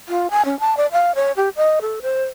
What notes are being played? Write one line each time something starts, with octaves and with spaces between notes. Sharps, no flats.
F4
G#5
C#4
A5
D5
F5
C#5
G4
D#5
A4
C5